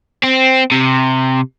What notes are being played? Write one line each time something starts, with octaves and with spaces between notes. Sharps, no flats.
C4
C3